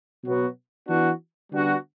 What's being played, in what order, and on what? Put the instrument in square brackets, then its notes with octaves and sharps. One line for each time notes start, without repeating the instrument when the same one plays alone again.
[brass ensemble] B2 F#3 B3 F#4
E3 B3 D4 F#4
D3 G3 B3 D4 F#4